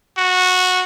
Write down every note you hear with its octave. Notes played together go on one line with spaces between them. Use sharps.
F#4